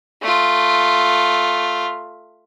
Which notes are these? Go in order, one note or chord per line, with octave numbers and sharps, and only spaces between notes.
A3 F4